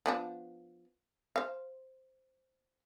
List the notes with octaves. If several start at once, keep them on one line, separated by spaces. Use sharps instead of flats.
F3 B3 D4
C5 F5